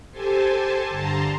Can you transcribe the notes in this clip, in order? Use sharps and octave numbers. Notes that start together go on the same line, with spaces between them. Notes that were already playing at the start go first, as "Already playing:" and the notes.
G4 A4 C5 G#5 A5
G2 D3 A5 A#5 C6